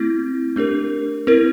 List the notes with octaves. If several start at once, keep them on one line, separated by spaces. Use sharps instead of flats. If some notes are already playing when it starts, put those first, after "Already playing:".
Already playing: A3 C4 E4
A3 D4 G4 A#4
C4 E4 A#4